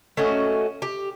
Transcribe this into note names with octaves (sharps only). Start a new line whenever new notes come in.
A3 C#4 F#4 D#5
G4